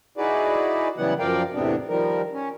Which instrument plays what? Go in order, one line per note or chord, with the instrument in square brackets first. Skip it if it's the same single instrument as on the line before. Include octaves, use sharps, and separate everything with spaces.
[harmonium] D#4 E4 F#4 G#4 B4 D5
C#3 E3 F#3 G3 B3 F#5
F#2 F3 A#4 D5 F5 G5
E2 A2 C3 B3 C4 D4
D#3 F3 G3 A#4
C#4